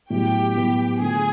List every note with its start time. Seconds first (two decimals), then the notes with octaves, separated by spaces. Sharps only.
0.10 A2 F#3 B3 E4 G4 G5
0.56 A2 F#3 B3 E4
1.00 D3 F3 A3 G#4 G#5